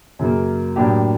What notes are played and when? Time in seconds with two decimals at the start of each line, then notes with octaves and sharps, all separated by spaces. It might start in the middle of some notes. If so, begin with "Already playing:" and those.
0.19 F#2 C#3 F#3 A#3
0.76 A2 F#3 A#3 D4 G4